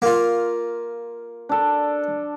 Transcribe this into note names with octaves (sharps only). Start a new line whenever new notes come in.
A#3 F4
D4 A4